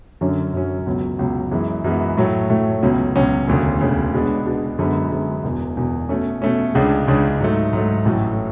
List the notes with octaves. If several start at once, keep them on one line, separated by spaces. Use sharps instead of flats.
F#2 D3 F#3 C#4
F#2 D3 F#3 C#4
C#2 B2 F#3
C#2 B2 F#3
F#2 E3 G#3 B3
F#2 E3 G#3 B3
A2 F#3 A3
A2 F#3 A3
C#2 B2 F#3 C#4
C#2 B2 F#3 C#4
E1 D2 C#3
E1 D2 C#3
B2 G#3 B3 D4
B2 G#3 B3 D4
F#2 D3 G#3 B3
F#2 D3 G#3 B3
E1 E2 B2
E1 E2 B2
B2 A3 C#4
B2 A3 C#4
C#2 C#3 G#3 D4
C#2 C#3 G#3 D4
G#2 F#3 A3
G#2 F#3 A3
A1 A2 F#3 A3